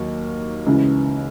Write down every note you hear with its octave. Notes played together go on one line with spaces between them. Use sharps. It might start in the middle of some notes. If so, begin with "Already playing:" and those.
Already playing: D#2 F#3 A#3 D#4
C#2 C#3 E3